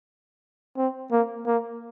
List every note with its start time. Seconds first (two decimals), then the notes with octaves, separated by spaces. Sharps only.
0.77 C4
1.12 A#3
1.47 A#3